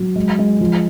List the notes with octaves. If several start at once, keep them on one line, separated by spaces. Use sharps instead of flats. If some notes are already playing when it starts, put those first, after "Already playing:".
Already playing: F#3
G#3
G#3
F3